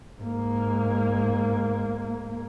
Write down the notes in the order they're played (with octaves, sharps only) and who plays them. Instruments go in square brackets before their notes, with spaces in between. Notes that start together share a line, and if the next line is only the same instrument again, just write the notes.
[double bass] G#2 A#3